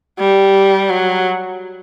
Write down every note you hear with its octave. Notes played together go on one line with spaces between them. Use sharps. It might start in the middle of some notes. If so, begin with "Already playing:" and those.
G3
F#3